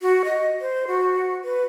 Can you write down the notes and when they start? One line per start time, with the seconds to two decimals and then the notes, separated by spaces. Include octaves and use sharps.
0.01 F#4
0.25 D#5
0.61 C5
0.87 F#4
1.44 B4